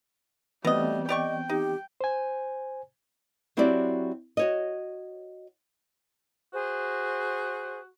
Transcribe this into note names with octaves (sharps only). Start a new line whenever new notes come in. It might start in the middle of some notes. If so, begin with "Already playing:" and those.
B2 E3 G3 A3 B3 C4 D#5
G4 D5 D#5 G5 C#6
D#4 G4
C5 G#5
F#3 C4 E4 F#4 G4 D5
F#4 C#5 D#5
F#4 G#4 C5